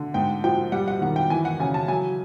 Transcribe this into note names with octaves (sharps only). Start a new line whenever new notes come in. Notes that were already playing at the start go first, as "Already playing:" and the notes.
Already playing: D3
G#2 G5
F3 G5
G3 F#5
F#5
D#3 F#5
G5
E3 G#5
F#5
C#3 G#5
A5
F#3 G#5